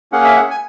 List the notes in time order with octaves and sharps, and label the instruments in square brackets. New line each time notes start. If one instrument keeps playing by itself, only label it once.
[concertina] A#3 C#4 G#4 F#5
E5
F#5
G#5